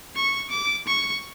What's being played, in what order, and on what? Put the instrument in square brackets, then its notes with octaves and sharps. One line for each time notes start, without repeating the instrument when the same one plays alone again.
[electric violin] C#6
D6
C#6